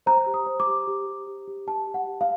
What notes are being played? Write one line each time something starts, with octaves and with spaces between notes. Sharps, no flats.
C5 A#5
G4
D#6
C5
D6
G4
G4
G4
G4
G4
G4 A5
G4
F#5
G4
F5